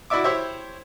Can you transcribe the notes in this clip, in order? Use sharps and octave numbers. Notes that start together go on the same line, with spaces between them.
E4 F#4 D5 E5 D6
E4 G4 C5 C#5 E5